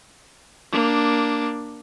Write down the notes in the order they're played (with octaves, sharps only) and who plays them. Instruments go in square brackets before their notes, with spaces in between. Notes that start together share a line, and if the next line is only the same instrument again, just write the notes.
[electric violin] A#3 D4